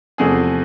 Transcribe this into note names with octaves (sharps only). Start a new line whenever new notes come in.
E2 C3 F3 A3 G#4